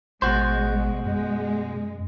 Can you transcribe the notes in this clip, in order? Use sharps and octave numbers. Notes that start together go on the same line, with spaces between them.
A1 B2 G#3 F#4 C5
F#2 G#3